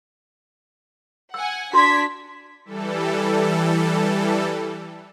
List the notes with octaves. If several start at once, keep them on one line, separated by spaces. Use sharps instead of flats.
F#5 G#5 E6
D4 F#4 C6 G#6 B6
E3 G3 A4